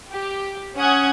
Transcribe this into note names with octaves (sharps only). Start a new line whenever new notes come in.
G4
C#4 F#5 D#6 G#6